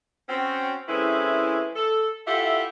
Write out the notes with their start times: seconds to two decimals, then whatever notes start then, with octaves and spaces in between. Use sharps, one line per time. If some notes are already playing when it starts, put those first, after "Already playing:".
0.29 C4 C#4 F#4
0.88 E3 G#3 A3 C4 C#4 E4
1.76 A4
2.27 E4 F4 G4 A4 E5 F#5